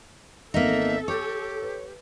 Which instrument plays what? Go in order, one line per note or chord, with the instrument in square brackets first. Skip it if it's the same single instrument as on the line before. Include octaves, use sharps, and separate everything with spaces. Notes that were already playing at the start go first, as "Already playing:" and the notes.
[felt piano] G#1 B3 [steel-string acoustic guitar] A#3 D#4 [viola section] A4 [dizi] E5
[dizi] G4 [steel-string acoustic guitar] C#5 [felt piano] D6
[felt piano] B4